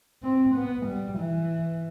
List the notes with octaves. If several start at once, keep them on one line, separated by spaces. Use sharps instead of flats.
C4
B3
G3
E3